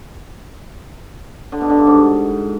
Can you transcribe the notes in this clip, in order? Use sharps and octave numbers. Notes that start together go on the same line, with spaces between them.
D3
B2
D3
G2
G#2